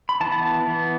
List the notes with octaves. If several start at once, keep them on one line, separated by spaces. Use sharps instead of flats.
B5
E3 B3 A5
E3 B3